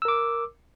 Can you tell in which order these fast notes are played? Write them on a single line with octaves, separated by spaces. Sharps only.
E6 A#4 D6